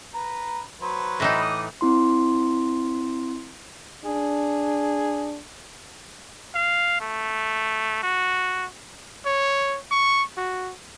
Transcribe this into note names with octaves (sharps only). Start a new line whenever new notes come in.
B4 A#5
F#3 B4 C5
A2 E3 D#4
D#5 D6
C4 E4 C6
D4 G#4
F5
A3
F#4
C#5
C#6
F#4